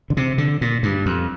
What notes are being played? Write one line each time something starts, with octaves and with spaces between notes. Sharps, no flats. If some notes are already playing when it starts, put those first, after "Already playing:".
D3
C3
D3
A#2
G2
F2